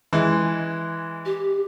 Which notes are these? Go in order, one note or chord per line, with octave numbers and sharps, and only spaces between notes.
E3 G#3
G4